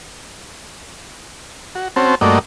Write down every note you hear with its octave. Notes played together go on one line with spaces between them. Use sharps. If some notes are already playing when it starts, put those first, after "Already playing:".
F#4
C4 C#4 F#4 C5 A5
G2 A3 A#3 F#4 D5 D#5